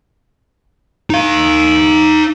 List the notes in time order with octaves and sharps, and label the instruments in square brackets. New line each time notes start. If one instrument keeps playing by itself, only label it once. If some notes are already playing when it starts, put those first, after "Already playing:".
[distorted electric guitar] D#4 F5